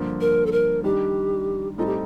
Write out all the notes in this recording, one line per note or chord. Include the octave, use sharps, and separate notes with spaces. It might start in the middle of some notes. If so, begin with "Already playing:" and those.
Already playing: G2 D3 F3 A#3
A#4
A4
A#4
D#3 G3 D4 G4
A2 G3 C4 D#4 F4 A4
G4